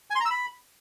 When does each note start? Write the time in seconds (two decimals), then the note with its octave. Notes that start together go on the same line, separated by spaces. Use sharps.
0.10 G#5
0.15 C6
0.20 A#5
0.25 E6
0.30 B5